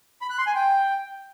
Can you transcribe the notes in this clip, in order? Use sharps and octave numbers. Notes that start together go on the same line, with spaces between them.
B5
F#6
C6
G#5
G5